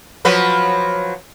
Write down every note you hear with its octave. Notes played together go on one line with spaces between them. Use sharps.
F3 F#3 B4